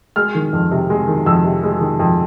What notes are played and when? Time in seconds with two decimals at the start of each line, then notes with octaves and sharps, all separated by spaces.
0.16 G#3 F6
0.35 D#3
0.53 F2
0.71 C3
0.90 G#3
1.07 D#3
1.26 F2 E6
1.44 C3
1.64 G#3
1.81 D#3
1.99 F2